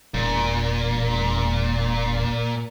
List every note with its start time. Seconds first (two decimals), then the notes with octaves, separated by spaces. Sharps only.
0.14 E1 A#2